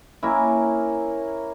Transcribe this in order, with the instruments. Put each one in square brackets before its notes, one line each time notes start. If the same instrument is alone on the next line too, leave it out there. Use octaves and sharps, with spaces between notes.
[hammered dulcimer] A#3 C#4 E4 A#4